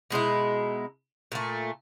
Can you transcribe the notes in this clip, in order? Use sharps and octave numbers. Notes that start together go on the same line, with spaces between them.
B2 G#3 D#4 E4
A#2 A3